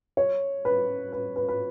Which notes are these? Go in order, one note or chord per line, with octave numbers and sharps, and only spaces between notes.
C#5
B4
B4
B4
B4